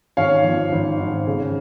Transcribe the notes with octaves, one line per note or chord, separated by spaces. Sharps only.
G#1 C#5 F5
F3
G#1
G#1
C#3